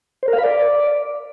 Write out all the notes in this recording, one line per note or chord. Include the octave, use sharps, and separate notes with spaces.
C5
A#4
F5
B5
D5